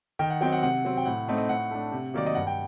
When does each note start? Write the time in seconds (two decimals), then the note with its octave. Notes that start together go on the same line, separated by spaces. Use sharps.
0.19 D#3 G5
0.30 F#5
0.41 F#3 C4 D#4 G5
0.52 F#5
0.62 C3 F#5
0.85 F#3 C4
0.97 G5
1.06 A2 F#5
1.28 A3 C4 D#4
1.38 D#5
1.49 A2 F#5
1.71 A3 D4
1.92 C3
2.14 D#3 F#3 A#3 D5
2.26 D#5
2.35 G2 F#5
2.47 G5